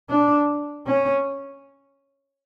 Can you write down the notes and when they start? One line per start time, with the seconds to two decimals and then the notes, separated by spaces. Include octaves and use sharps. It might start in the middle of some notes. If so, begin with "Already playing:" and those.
0.09 D4
0.86 C#4